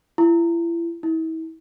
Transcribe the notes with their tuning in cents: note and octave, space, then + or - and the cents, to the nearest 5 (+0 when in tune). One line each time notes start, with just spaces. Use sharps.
E4 +35
E4 -40